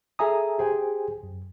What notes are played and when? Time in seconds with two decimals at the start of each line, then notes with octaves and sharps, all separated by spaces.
0.19 G#4 A4 E5 G#5 A#5 D#6
0.58 G4 G#4 C5 G5 G#5
1.23 F#2